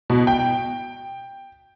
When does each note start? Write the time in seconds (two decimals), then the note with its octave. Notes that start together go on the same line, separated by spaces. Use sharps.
0.10 B2
0.27 G5